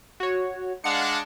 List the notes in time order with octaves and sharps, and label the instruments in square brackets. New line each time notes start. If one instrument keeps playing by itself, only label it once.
[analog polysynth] F#4 C#5
[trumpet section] G#3 D4 [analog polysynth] F5 F#5 C#7